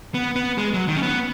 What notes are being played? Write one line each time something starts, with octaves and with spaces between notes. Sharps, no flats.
B3
B3
G#3
F#3
D#3
C#4
B3